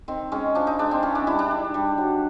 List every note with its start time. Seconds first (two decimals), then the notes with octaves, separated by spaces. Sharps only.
0.08 D#3 C4
0.32 G#3 C#4
0.55 F3 D4
0.67 D#4
0.79 G#3 D4
0.91 C4
1.03 E3 C#4
1.15 D4
1.27 G3 E4
1.39 D4
1.51 D#3
1.74 G3
1.98 F#3